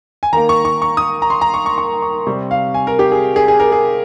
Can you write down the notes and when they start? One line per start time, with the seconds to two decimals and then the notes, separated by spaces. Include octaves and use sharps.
0.23 G#5
0.33 D#3 A#3 A#5
0.49 C#6
0.65 C#6
0.82 C#6
0.97 D#6
1.22 A#5
1.30 C6
1.42 A#5
1.54 C#6
1.66 C#6
1.78 C#6
2.02 C#6
2.27 C3 G3 C4 C#6
2.51 F5
2.74 G#5
2.87 A#4
2.99 G4
3.12 G#4
3.36 G#4
3.48 G#4
3.60 A#4
3.72 G#4